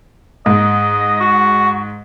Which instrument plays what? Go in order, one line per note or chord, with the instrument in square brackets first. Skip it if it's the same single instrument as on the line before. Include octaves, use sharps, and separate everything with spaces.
[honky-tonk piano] G#2 [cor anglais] D#5
[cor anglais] F#4